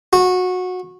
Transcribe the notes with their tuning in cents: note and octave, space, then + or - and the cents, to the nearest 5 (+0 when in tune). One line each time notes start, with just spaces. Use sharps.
F#4 -20